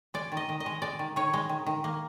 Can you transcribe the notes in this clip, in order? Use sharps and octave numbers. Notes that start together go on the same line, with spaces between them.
G#3 D5
D#3
D#5
D#3
D#5
G#3
G#3 D5
D#3
D#3 C#5
G#3
D#3
D#3
A#3